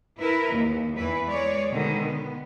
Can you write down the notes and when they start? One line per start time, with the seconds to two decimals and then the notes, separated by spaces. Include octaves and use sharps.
0.19 E4 A#4 B4
0.52 D#2
0.96 E2 E3 E4 B4
1.29 G#3 C#5 D5
1.71 B2 D3 D#3 G#3 B3
2.02 B3